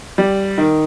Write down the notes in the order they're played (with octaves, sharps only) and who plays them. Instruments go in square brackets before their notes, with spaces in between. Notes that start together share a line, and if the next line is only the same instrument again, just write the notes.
[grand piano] G3
D#3